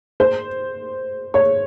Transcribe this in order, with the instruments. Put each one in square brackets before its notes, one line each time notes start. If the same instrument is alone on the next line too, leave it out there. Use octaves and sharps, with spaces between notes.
[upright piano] C5
C#5